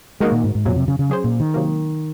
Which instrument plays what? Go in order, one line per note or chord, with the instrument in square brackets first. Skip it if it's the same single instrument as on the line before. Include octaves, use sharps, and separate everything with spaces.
[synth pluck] D#3 A#3 D#4 F#4 A#4 [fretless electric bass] G#3
[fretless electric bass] A#2
G#2
G#2
[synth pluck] F2 C#3 F#3 [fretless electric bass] A#2
[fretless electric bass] C3
C#3
C#3
[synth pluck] F#3 C#4 G#4 C5
[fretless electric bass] A#2
D#3
[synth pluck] C3 F#3 A#3